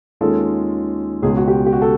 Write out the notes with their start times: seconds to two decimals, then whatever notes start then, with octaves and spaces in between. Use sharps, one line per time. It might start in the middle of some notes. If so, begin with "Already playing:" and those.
0.21 D#2 D#3 G#3 C#4 F4 A4
1.22 C#2 B2 G#3 G#4
1.37 F#4
1.48 G4
1.66 G4
1.73 F#4
1.82 A4